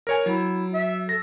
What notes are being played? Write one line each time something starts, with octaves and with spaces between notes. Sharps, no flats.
A#4 C#5 G#5
F#3 E4
E5
A4 A#6